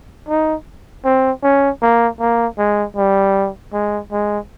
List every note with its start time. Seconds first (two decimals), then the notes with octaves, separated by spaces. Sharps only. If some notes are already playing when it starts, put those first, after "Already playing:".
0.28 D#4
1.05 C4
1.43 C#4
1.82 A#3
2.20 A#3
2.58 G#3
2.97 G3
3.73 G#3
4.12 G#3